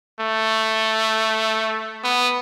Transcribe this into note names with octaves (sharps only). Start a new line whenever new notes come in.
A3
B3